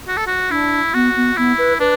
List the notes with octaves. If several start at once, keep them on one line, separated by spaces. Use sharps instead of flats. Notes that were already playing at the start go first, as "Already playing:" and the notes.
F#4
A4
F#4
D4 E4
B3 F#4
B3
B3 E4
B4
D4 B4